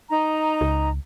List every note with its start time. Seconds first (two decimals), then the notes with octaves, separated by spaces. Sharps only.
0.10 D#4 A#5
0.61 C#2